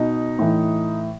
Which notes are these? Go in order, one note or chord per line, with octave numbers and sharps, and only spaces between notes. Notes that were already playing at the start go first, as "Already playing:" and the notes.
Already playing: B2 D#4
A2 E3